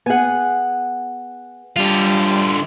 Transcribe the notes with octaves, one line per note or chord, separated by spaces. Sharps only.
B3 G#4 F#5 G#5
D3 G3 F4